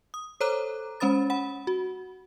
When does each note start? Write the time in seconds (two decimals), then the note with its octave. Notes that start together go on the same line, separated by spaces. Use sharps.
0.14 D#6
0.40 A4 C5 C#5 A#5 D6 F#6
1.00 G#3 C#4 C5 B5 D#6 A6
1.30 F#5 B5
1.67 F#4